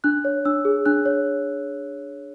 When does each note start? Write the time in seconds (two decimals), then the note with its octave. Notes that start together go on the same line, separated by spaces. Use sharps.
0.04 D4 F#6
0.25 C#5
0.45 D4 E6
0.65 G#4
0.86 D4 F#6
1.06 C#5